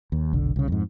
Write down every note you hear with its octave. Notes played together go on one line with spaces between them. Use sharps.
D#2
F1 B1 D3
C2 C#3
F2 G#2